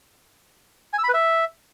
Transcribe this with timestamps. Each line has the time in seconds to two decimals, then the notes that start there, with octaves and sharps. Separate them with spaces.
0.93 G#5
0.99 E6
1.04 B5
1.09 B4
1.14 E5